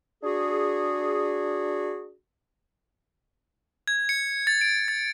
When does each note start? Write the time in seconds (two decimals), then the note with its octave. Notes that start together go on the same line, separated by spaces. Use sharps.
0.23 D4 F#4 G#4
3.88 G#6
4.09 C#7
4.47 A6
4.61 D7
4.88 A6